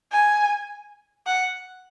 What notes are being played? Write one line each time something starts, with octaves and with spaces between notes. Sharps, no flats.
G#5
F#5